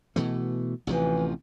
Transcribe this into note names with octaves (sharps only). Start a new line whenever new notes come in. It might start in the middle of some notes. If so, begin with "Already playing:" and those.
B2 E3 A3
A1 C3 E3 F3